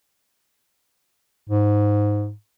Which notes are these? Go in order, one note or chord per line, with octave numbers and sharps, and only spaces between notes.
G#2